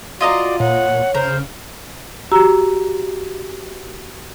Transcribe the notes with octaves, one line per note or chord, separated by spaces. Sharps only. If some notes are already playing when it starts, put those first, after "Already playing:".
F4 F#4 D5 D#5 A#5
A#2 C#5 F#5
C#3 A#4 C5
F#4 G4 A#5 E6